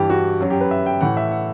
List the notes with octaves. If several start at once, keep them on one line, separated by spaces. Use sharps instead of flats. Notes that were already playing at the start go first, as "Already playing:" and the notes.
Already playing: G2 E3 G4
F#4
F#2 F#3
G4
B4
E5
G5
A2 E3 F#5
E5
F#5